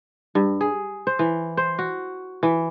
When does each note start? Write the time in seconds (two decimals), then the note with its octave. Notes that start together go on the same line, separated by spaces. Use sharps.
0.35 G2
0.61 G#4
1.07 C5
1.19 E3
1.57 C5
1.79 F#4
2.43 E3